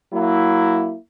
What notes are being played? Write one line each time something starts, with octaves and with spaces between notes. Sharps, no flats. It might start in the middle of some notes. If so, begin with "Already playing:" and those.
F#3 A#3 E4